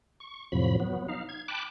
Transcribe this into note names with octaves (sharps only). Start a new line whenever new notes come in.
C#6
F2 A2 C3 F3 F#3 B5
F#3 B3
D#4 F5
G#6
G5 A5 B5 D6 F#6